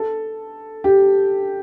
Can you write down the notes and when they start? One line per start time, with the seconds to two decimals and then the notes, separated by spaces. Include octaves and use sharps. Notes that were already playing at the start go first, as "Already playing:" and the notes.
Already playing: A4
0.84 G4